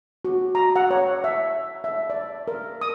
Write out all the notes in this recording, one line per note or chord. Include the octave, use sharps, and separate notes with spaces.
F#4
A#5
F#5
C#5
E5
E5
D5
A#4
D#6